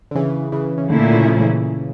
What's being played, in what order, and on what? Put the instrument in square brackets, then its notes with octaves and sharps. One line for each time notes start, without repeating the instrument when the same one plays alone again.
[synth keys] D3
C#3 E3
C#3 E3
C#3
[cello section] A#2 A3 C#4 E4 [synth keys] D3
[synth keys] D3
C#3
F3
C#3 E3